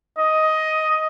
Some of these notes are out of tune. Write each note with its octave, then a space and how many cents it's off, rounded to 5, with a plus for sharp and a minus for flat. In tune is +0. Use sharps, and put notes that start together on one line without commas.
D#5 +10